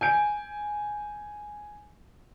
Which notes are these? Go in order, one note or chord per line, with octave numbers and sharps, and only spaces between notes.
G#5 G6 D7